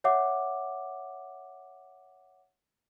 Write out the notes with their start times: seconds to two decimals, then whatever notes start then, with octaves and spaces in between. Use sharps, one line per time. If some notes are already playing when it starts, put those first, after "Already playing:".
0.04 C#5 E5 F#5 D6